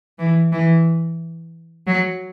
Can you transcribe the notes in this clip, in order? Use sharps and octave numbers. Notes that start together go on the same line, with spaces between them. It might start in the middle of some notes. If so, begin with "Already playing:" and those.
E3
E3
F#3